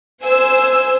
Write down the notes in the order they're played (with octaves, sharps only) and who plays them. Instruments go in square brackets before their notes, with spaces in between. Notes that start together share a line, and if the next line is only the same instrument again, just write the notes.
[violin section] C5 G#5 E6